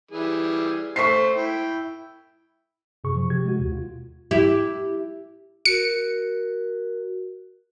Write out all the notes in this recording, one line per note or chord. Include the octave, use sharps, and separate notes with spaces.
E3 G3 G#4
A3 C5 C#6 B6 C7
E4 G5
F#2 C3 G#4 C#6
F3
C3 G4 G#6
G#3 F#4
D#2 B2
F4
E4 G4
F#4 A#4 C#7